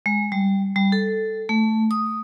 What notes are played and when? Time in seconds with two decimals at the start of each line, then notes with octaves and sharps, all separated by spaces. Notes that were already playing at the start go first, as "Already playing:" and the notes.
0.06 G#3
0.32 G3
0.76 G3
0.92 A4
1.49 A3
1.91 D#6